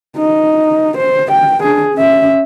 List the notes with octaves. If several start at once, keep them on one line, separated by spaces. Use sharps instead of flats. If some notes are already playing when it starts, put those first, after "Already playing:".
D#4
C5
G5
D4 G#4
C#4 E5